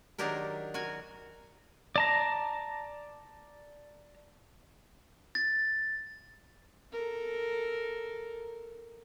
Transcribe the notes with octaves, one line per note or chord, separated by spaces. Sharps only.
D#3 F#3 D4 G4 G#4 A#4
F#4 A#4 G#5
D5 A5 A#5
A6
A4 A#4